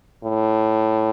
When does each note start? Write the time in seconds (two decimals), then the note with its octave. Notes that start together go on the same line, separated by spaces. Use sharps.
0.24 A2